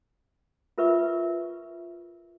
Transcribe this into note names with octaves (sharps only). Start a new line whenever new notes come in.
F4 A#4 B4 E5 C#6